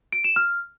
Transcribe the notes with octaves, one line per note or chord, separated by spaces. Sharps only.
D7
E7
F6